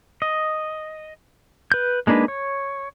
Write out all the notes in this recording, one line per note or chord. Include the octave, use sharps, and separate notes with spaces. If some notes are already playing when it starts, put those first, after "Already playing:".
D#5
B4 G6
G#3 A#3 D4 D#4 B4
C#5